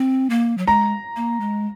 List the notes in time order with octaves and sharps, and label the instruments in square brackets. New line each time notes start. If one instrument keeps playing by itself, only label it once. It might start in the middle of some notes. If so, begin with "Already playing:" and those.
Already playing: [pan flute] C4
A#3
F#3
[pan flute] G#3 [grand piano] A#5
[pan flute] A#3
G#3